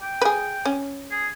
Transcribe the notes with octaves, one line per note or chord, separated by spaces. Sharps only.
G5
G#4 B4
C#4
G#4